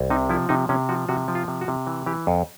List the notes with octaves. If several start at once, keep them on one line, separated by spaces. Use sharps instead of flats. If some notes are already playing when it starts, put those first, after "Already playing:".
Already playing: C2
C3 D#4
F3 E4
C3 D#4
C3 C#4
F3 F#4
C3 F#4
F3
F4
C3
F#4
C3
E3
E3 G4
F2